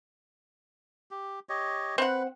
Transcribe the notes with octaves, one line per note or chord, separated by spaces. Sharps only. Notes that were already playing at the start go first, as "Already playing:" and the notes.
G4
G4 C#5 D#5
C4 B4 F#5